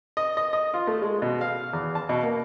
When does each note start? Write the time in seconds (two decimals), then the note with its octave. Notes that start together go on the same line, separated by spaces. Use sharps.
0.17 D#5
0.37 D#5
0.53 D#5
0.74 F4
0.87 A3
1.02 G#3
1.22 B2
1.41 F5
1.73 E2
1.95 A5
2.09 B2
2.23 A#3